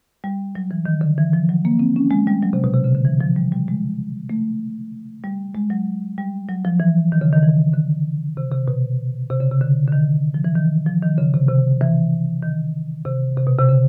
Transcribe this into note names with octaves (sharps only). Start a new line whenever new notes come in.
G3
F#3
E3
D#3
D3
E3
F3
F#3
A#3
C4
C#4
G#3
G3
F#3
C3
B2
C3
C#3
D3
E3
F3
G3
G3
G#3
A3
G3
G#3
F#3
G3
F#3
F3
E3
D#3
C#3
D#3
E3
D3
C3
C3
B2
C3
C#3
C3
D3
D3
D#3
F3
E3
D#3
F3
D#3
C#3
C3
C3
E3
D#3
C3
C3
B2
C3
C#3